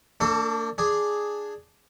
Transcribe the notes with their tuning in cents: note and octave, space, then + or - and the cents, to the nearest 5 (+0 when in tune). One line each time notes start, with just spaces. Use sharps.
A#3 -40 D4 +0 A4 +15
D4 +0 G#4 +0